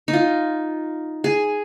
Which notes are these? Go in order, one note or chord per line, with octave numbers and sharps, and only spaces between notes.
D#4
F4
G#4